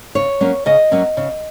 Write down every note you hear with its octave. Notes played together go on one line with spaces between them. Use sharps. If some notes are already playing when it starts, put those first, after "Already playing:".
C#3 C#5
F#3 A#3 C#4
C#3 D#5
F#3 A#3 C#4
C#3